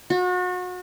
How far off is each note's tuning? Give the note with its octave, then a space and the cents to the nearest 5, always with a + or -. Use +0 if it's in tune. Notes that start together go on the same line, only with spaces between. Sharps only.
F#4 -35